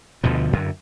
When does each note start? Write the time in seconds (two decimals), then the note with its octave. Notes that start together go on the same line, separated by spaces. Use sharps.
0.24 D2 B2 D3 F3
0.53 F#2 D3